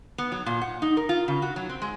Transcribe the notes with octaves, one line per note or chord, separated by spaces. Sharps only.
B3
F#3
A#2
F#5
D#4
A#4
F4
C#3
F#4
F#3
C4
G#3